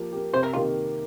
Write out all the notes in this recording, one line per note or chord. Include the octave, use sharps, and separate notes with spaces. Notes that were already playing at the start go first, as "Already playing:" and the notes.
Already playing: F3 A#3 G4
A#3 G4
C3 C5
A#4
D#3 A#3 D#4 F4 G4